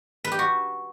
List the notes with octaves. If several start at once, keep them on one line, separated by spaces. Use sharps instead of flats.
B4
G4
F#4